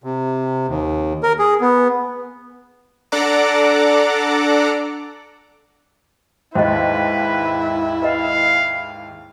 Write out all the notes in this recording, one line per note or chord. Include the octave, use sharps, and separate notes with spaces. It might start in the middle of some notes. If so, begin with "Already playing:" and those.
C3
D#2
A#4
G#4
B3
D4 A4 D5 F#5 A#5 D6
D#2 G#2 E4 B4 C5 D#5
B4 D#5 F5